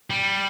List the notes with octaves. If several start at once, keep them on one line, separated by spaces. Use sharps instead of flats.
G3